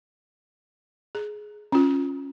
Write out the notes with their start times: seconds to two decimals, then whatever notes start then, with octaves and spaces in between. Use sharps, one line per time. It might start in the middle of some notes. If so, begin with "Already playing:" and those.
1.15 G#4
1.72 C#4 F4